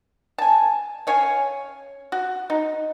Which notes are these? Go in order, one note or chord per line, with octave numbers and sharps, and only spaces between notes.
G#5 A5
C#4 C#5 F5 G#5
F#4
D#4